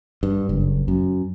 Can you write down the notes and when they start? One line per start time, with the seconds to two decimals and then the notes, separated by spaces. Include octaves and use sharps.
0.23 G2
0.49 F#1
0.88 F#2